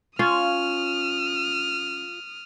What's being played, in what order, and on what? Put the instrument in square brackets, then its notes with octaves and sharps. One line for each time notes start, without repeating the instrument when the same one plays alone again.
[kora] C#4 [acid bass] F4 [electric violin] D#6 F6